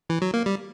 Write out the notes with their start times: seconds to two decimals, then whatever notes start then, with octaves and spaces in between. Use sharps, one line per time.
0.10 E3
0.22 F#3
0.34 A#3
0.46 G3